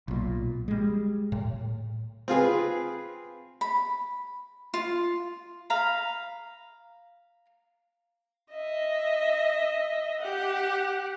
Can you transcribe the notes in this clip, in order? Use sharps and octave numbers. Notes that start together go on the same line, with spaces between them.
B1 A#2
G3 G#3
A2
C4 F4 G#4 B4
B5
F4
F5 A#5 B5
D#5 E5
G4 F#5